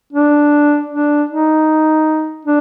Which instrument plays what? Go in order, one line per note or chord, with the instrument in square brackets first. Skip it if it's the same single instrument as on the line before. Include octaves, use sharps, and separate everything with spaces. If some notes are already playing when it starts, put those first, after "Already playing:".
[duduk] D4
D4
D#4
D4